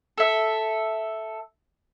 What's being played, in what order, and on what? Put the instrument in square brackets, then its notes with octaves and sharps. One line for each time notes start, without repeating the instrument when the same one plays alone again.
[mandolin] A4 E5